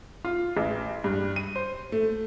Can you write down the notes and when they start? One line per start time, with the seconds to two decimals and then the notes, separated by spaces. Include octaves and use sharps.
0.25 F4
0.57 A1
1.04 G2
1.36 D#7
1.56 C5
1.92 A3